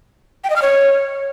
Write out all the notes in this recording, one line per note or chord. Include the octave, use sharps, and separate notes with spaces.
G5
D#5
F6
C#5